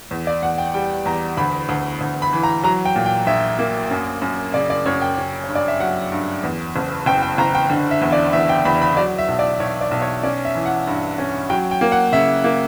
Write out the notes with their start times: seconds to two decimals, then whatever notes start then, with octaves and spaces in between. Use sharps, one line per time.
0.11 E2
0.27 D5
0.43 E2 F#5
0.58 G5
0.74 G3 G5
1.06 E2 A#5
1.37 D2 B5
1.69 D2
2.01 D2
2.22 B5
2.33 E3
2.43 A#5
2.64 F#3 A#5
2.85 G5
2.96 A#2
3.06 G5
3.27 A#1 E5
3.59 A#3
3.91 F#2
4.22 F#2
4.54 C#3 D5
4.70 D5
4.86 F#2 C#5
5.02 G5
5.17 C#4
5.44 G2 C#5
5.55 D5
5.68 E5
5.80 F#3 F#5
6.12 G2
6.43 E2
6.76 F#1
7.06 F#1 G5
7.23 G5
7.38 F#1 A#5
7.55 G5
7.70 D3
7.91 E5
8.01 E2
8.12 D5
8.33 E2 E5
8.49 G5
8.65 E2 B5
8.81 B5
8.97 F#3 D5
9.18 E5
9.28 B1
9.39 D5
9.60 B1 C#5
9.81 D5
9.91 B1
10.02 C#5
10.23 C#4 D5
10.45 E5
10.55 E3
10.66 F#5
10.87 G2
11.18 C#4
11.50 F#3 G5
11.71 G5
11.81 A#3
11.92 F#5
12.12 C#3 E5
12.44 A#3